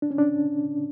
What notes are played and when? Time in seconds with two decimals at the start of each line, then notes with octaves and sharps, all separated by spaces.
0.02 D4
0.11 C#4
0.18 D4